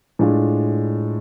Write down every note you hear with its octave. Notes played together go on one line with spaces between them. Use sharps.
A2 G#3 D4 F4